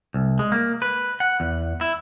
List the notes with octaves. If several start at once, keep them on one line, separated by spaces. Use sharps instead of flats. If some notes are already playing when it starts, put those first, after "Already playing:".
C2
G#3
A#3
B4
F#5
E2
E4